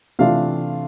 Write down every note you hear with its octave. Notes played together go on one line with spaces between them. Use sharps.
C3 E3 A3 D4 F4 F5